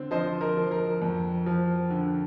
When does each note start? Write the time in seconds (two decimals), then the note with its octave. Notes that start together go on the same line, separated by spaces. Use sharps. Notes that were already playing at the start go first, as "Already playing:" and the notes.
Already playing: D3 C4
0.11 F3 C5 D#5
0.41 A#4
0.57 F3
0.71 A#4
1.02 F2
1.46 F3
1.90 D3